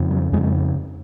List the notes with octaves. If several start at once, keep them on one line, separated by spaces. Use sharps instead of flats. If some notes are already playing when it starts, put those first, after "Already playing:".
Already playing: F2 C#3
F#3
F2 C#3 G#3
G#3